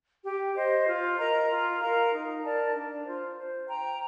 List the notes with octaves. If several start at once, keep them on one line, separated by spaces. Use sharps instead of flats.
G4
C5 D#5
F4
A#4 D#5 A#5
F4
A#4 F5 A#5
D#4
A#4 D5 A5
D4
F4 C5
C5
G5 A#5